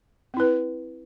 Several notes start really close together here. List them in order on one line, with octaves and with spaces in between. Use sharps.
C4 E4 B4